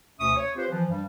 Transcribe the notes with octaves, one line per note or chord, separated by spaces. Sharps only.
D2 B2 C#4 E5 C#6 D#6
C#5
C4 F4 G4 B4 C5
E3 F3
G2 G3